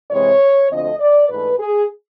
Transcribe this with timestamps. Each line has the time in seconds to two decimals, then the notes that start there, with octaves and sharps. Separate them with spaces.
0.11 C3 E3 G#3 C4 C#5
0.70 D2 D3 F3 A3 C4 D#5
0.99 D5
1.29 G#2 E3 A3 D4 B4
1.59 G#4